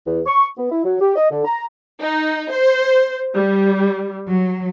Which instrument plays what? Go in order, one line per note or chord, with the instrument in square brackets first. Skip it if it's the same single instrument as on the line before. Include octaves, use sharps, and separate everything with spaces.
[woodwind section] E2
C#6
B3
E4
F#3
G4
D#5
D3
A#5
[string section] D#4
C5
G3
F#3